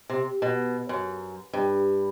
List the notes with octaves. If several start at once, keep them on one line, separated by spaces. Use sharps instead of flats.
C3
B2
F#2
G2